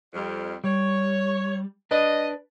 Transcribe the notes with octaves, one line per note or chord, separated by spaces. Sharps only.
F2 G3
G3 C#5
D4 B4 D5 D#5